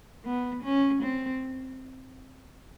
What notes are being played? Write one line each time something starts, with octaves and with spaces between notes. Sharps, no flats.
B3
C#4
C4